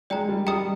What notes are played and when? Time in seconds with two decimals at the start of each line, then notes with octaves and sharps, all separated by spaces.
0.10 G#3 D5 G5 A#5
0.29 G3
0.47 G3 D#5 G5 A#5 D#6